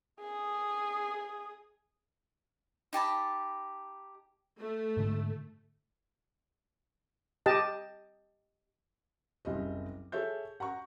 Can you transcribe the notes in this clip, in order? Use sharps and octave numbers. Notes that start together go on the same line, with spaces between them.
G#4 D#6
D#4 G4 A5 B5
A3
G#2 D3
G4 D#5 A5
F#1 C2 G4 D#5
G#4 A4 C#5 E5 G6
F#5 A#5 C#6